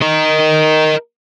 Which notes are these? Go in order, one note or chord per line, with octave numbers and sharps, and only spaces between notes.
A#4 D#5